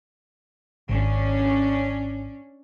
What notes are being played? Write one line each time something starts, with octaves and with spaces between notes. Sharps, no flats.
G#1 C#4 D4